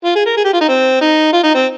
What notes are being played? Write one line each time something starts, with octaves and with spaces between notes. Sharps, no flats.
F4
G#4
A#4
G#4
G4
F4
D#4
C4
D#4
F4
D#4
C4